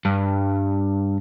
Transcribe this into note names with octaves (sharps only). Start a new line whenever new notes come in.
G2